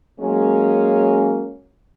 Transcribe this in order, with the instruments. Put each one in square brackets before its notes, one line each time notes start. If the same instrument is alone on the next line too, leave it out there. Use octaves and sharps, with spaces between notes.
[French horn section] F#3 G#3 A#3 C#4